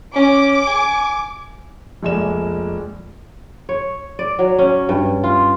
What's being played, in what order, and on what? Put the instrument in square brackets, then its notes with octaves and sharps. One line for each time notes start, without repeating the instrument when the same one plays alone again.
[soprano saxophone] C#4 [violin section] D6
[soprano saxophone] G#5
[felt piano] F1 A#1 G#3 D5 E7
[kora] C#5
D5
F#3
C#4
G2
F4